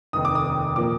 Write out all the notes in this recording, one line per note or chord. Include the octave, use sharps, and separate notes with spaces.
F1 D#2 D#3 D#6
D6
D#6
A#2 F3 A#3 D6